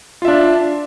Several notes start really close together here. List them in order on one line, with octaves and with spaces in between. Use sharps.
F4 E5 D4